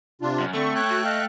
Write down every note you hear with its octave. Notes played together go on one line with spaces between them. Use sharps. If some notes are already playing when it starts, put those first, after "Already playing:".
C3 D4 F4
F#2
D3 A3 C4 C#6
C#5 G5 F#6
F#4
D#5 F5